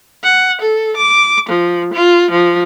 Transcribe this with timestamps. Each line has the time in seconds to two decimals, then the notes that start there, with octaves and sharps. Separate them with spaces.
0.23 F#5
0.61 A4
0.97 D6
1.49 F3
1.94 F4
2.31 F3